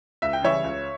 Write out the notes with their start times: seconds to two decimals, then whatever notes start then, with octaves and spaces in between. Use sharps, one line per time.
0.22 C#2 E5
0.33 G5
0.42 C#3 E3 G3 C#5 E5
0.64 C#2